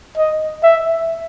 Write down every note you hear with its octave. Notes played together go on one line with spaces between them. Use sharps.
D#5
E5